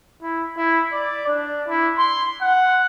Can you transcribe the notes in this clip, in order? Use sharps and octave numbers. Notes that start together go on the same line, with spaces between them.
E4
E4
D5
D4
E4
C6
F#5